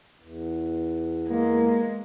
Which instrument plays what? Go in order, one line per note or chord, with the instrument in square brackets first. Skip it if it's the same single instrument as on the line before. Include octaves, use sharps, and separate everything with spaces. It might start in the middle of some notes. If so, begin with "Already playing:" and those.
[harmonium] E2
[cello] G#3 [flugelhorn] A#3